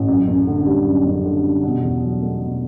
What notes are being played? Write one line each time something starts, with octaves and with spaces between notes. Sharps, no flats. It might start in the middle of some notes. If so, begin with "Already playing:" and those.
Already playing: A1
F#2
F#1
D3
G3
F#2
F#1
D3
G3
B2
E2
F#3
A3
B2